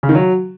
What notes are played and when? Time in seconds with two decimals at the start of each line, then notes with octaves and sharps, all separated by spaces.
0.03 C#3
0.09 D#3
0.15 F#3